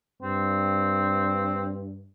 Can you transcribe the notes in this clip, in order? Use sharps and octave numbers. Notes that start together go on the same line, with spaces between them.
G2 C4